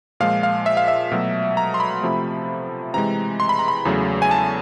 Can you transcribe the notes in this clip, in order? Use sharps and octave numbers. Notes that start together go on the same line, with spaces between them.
A#2 F3 G#3 F5
F5
E5
F5
E5
B2 F#3 A3
A#5
C6
B5
C3 F3 A3
C3 E3 G#3 A#5
C6
B5
A#5
B5
E2 C#3 F#3 A3
G#5
A5